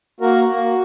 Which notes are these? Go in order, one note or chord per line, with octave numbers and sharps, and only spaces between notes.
A#3 F#4 A#4
A#3 F#4